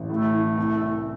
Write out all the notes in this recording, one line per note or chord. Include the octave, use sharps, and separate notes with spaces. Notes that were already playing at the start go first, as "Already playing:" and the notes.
Already playing: A1
A2 A3
E3
C2
C2